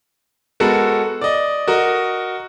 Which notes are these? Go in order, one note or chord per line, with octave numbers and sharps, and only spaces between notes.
G#3 B3 F#4 A4 A#4
D5 D#5
F#4 A#4 D#5